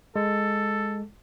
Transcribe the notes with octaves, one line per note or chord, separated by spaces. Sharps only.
G#3 A4